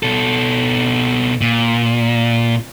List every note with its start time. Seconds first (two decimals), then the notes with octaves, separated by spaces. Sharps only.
0.03 B2 A4
1.41 A#2